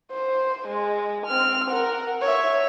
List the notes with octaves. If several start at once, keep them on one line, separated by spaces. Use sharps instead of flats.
C5
G#3
C4 F6
A#4 F#5
C#5 E5